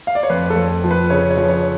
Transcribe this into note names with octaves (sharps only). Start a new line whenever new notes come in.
F5
D5
C#5
F2 B4
A4
F2
F3
B4
C#3 C#5
C#5
F3
C#5